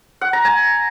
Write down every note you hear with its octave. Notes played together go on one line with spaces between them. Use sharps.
F#5
A#5
G#5